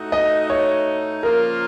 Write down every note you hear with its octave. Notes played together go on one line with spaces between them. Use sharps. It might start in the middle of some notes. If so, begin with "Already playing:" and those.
Already playing: A2 A3 D#4 F#4
D#5
C#5
C#3 F3 A#3 F4 A#4